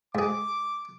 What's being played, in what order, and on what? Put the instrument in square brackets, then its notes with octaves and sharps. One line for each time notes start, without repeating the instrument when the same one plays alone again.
[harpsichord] G#2 G#4 [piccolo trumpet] D6